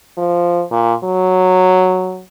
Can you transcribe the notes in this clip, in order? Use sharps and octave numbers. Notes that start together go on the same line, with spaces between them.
F3
A#2
F#3